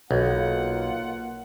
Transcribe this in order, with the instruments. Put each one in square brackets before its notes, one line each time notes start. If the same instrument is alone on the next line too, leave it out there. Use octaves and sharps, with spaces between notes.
[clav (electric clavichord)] B1 [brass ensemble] A#3 F4 F#5